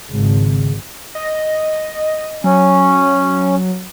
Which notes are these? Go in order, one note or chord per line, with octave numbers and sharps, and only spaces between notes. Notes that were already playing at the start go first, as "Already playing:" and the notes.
G#1 C#3
D#5
F#3 C#4